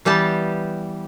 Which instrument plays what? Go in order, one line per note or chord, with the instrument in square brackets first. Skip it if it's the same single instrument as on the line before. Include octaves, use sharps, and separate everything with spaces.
[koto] E3 G3 B3 G4 A5